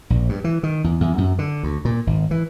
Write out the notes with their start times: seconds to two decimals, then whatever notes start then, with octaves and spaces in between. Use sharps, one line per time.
0.10 A#1
0.29 G2
0.44 E3
0.63 D#3
0.84 E2
1.01 E2
1.18 F#2
1.39 D3
1.63 D2
1.85 A#2
2.07 G#1
2.31 E3